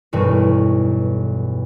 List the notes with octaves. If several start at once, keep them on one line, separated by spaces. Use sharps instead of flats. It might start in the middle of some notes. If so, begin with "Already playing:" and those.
B1 E2 G2 A3